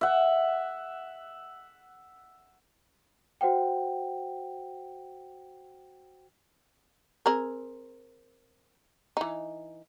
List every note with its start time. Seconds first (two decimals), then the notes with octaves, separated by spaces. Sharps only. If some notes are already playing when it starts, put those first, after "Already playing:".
0.01 E5 F#5
3.41 F#4 C5 F#5 G5
7.26 C4 G#4 A#4
9.17 E3 D#4